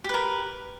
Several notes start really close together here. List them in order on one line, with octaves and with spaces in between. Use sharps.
G4 B4 A#4